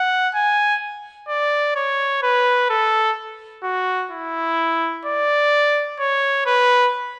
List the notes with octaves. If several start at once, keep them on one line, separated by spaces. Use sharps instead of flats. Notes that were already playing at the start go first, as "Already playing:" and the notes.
Already playing: F#5
G#5
D5
C#5
B4
A4
F#4
E4
D5
C#5
B4